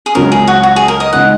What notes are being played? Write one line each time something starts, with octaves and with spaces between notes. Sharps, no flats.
G#4
C#2 C#3 F#3 C#4 A#4
G#4
F#4
F#4
G#4
A#4
D#5
C#3 G#3 D#4 F#5